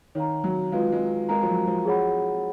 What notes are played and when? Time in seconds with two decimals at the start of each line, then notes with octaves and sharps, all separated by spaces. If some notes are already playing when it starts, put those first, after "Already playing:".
0.15 D#3 C#5 F5 A#5
0.44 F#3
0.72 G#3 F4 B4 F5
0.92 G#3
1.29 G#3 A#4 F5 A#5
1.43 F3
1.48 F#3
1.67 F3
1.85 G#4 C#5 F#5 B5